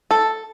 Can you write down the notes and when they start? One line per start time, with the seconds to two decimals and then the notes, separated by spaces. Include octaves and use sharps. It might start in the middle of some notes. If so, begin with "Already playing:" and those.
0.11 A4